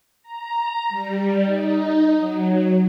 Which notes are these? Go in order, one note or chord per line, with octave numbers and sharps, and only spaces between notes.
A#5
G3
D#4
F#3